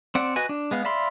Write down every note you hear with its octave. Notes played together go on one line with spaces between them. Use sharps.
C4 D5 F#5
F#4 B4 D#5 F#5 G#5
D4
G#3 B3 F5
D5 E5 F5 B5 C6